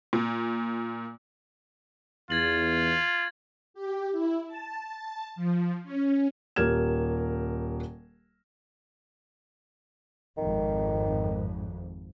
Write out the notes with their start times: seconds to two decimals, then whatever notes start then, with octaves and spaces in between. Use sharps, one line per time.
0.13 A#2
2.30 E2 F4 G#6 A6 F#7
3.74 G4
4.12 E4
4.47 A5
5.36 F3
5.84 C#4
6.56 D#1 G4 A#4 F6 G#6 E7
10.38 G#1 F2 D#3